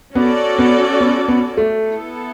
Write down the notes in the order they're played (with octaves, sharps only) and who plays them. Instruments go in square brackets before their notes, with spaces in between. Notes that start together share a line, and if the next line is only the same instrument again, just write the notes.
[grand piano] B3 [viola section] C#4 F#4 A4 D5
[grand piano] B3
B3
B3
A3
[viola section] B3 E4 A4